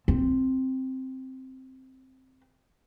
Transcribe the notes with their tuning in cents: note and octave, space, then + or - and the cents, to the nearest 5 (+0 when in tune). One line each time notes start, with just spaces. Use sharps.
C4 +0